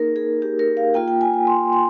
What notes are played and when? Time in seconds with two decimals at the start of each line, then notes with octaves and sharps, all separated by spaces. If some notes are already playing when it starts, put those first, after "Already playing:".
Already playing: A#3 D#4 G#4 A#4
0.16 G#4
0.42 G4
0.59 A#4
0.77 F5
0.94 A#3 F4 G5
1.08 G5
1.21 G#5
1.34 G#5
1.47 C6
1.73 C6